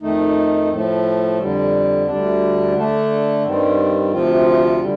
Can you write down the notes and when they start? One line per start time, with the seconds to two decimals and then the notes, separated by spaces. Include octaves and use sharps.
0.02 F2 D#3 A3 D#4
0.70 A2 F3 A3
1.39 F2 D3 G3
2.07 D2 D3 G3 D4
2.75 D3 A3 D4
3.44 G2 D#3 G3 C4
4.12 D2 C3 F3 C4 F4
4.80 D3 G3